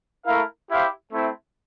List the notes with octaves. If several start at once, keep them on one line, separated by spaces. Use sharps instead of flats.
A3 E4 A#4 F5
E4 G4 C5 F5
A3 C4 E4